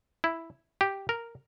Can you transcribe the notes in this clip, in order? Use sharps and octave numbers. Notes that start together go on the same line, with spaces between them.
E4
G4
A#4